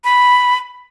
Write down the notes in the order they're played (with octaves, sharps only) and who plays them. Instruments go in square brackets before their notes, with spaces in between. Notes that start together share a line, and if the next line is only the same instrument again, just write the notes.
[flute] B5